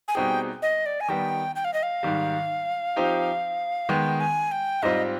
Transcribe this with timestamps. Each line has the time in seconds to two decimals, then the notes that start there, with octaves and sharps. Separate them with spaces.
0.08 G#5
0.15 B2 G3 C4 D#4 G#4 G5
0.62 D#5
0.86 D5
1.01 G#5
1.08 D#3 G3 B3 G5
1.56 G5
1.65 F5
1.74 D#5
1.83 F5
2.03 G#2 D#3 G3
2.96 F3 C4 D#4 G4
3.89 D#3 G#3 B3 G5
4.20 G#5
4.52 G5
4.82 G#2 G3 C4 F4 D#5